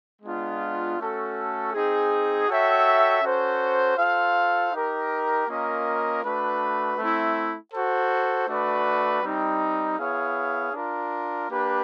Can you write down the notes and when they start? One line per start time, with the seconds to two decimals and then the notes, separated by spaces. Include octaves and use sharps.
0.22 G#3 B3 D4 F4
0.97 A3 C#4 F#4 A4
1.72 C4 D#4 G#4
2.47 F#4 A4 C#5 E5 G5
3.22 C#4 F#4 A4 C5
3.97 F4 A4 C5 F5
4.72 D#4 G4 A#4
5.47 A#3 C#4 F4 A#4 D#5
6.22 A3 D4 F#4 B4
6.97 A3 C4 E4
7.72 F#4 A4 C5
8.47 A3 D4 F#4 B4 D5
9.22 G3 C4 D#4
9.97 B3 E4 G#4 C#5 F5
10.72 D4 F4 A#4
11.47 A#3 D4 G4 B4